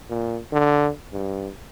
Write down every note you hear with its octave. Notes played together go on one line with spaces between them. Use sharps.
A#2
D3
G2